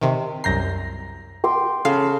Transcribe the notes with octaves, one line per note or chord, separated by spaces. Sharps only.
C3 D#3
C2 F#2 A#5 G6 A#6 C7
G5 C6 D6
C#3 A4 F5